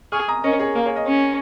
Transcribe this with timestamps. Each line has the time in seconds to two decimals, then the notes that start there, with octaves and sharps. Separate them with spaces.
0.12 G#4 C#6 F6
0.28 A#5 D#6
0.44 C#4 A#4 D#5
0.59 G#4 C#5
0.75 A#3 A#4
0.86 G#4 C#5
0.95 A#4 D#5
1.07 C#4